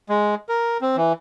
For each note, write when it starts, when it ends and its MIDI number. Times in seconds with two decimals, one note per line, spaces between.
0.09 0.35 56
0.49 0.78 70
0.81 0.96 60
0.96 1.13 52